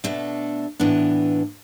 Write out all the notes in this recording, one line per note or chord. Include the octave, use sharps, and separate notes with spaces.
B2 A3 D4 A4
A2 E3 B3 D4